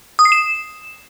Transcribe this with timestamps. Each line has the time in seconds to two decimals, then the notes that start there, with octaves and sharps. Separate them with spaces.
0.19 D#6
0.25 C7
0.32 E7